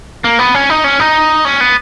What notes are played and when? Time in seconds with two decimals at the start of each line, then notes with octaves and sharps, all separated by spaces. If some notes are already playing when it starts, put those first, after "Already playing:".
0.24 A#3
0.39 B3
0.55 C#4
0.70 D#4
0.84 C#4
1.00 D#4
1.45 C#4
1.61 B3